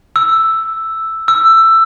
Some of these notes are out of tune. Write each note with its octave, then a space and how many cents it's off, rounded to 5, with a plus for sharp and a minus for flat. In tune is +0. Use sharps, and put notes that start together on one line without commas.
E6 +0
E6 +10